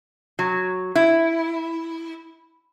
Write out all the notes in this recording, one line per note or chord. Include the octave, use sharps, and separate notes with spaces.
F#3
E4